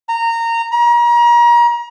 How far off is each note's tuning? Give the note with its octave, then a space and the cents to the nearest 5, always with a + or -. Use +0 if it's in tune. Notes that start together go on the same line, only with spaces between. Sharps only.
A#5 -20
A#5 +35